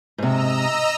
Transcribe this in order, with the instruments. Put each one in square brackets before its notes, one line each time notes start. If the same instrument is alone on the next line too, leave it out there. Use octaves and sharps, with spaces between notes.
[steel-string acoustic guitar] G#2 C3 [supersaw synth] D#5 A#5 E6